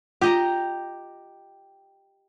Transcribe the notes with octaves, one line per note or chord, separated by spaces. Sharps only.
F4 G4 D#5 A#5